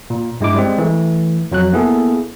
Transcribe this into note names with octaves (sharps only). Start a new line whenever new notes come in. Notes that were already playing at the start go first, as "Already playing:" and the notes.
A#2
G2 G#3 E4 D6
G3 G#3 C4
E3 A3
F2 F#3 F#4 F#6
A#3 B3 E4 G#4 A4